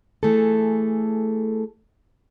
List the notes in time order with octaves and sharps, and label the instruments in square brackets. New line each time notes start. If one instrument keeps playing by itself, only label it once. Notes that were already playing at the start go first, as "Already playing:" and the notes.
[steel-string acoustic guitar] E3 A3 G#4 A4